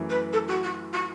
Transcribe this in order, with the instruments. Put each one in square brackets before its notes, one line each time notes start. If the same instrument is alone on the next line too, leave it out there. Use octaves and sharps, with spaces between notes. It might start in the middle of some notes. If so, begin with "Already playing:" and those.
Already playing: [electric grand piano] F#2 E3 A3
[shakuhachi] B4
A4
F#4
F#4
F#4